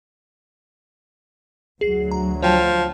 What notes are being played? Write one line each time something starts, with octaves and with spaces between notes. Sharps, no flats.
D2 F#3 G#4 C7
A#5
F3 C#5 G5 A5